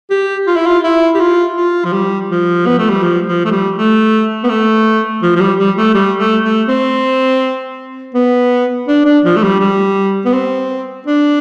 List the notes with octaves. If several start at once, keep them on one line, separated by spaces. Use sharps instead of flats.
G4
F4
E4
F4
E4
G4
F4
F4
F3
G3
F3
B3
A3
G3
F3
F3
A3
G3
A3
B3
A3
F3
F3
G3
G3
A3
G3
A3
A3
C4
B3
D4
D4
F3
A3
G3
G3
B3
C4
D4